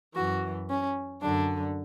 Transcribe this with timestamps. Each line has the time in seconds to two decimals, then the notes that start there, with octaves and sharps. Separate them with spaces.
0.15 F#2 E3 F#4
0.69 C#4
1.23 F#2 D3 D4